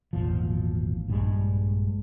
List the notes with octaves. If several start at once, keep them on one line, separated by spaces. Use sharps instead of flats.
G#1 E2 A#2 F3
A#1 G2 G3 G#3